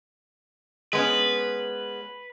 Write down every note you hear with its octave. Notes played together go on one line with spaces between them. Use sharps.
G#3 B3 C#4 B4